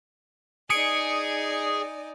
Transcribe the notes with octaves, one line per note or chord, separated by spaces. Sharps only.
D#4 G#4 D5 G#5 D#6 C#7 D7